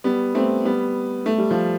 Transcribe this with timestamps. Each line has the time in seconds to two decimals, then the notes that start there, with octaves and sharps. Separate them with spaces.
0.04 G3 B3
0.35 A3 C4
0.65 G3 B3
1.26 A3
1.38 G3
1.51 F3